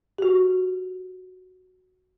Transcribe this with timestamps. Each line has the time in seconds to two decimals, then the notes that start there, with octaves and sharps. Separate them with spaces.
0.18 F#4 G4